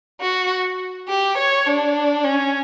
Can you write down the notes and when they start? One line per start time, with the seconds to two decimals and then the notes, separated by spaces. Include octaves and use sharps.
0.21 F#4
1.08 G4
1.38 C#5
1.67 D4
2.25 C#4